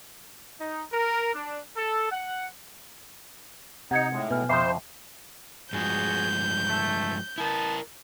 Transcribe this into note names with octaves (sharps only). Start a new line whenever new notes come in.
D#4
A#4
D4
A4
F#5
C3 D#4 F#5 G#6 C#7
A2 G#3 D#4
B2 B4 G#5 F6
F2 C#3 F3 C5 E5 D6 C7
G2 F3 G#3 F#4 G#4 G6
A3
B3 E4 A#4 A5